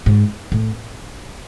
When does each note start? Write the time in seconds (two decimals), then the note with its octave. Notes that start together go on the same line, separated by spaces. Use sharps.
0.06 G#2
0.52 A2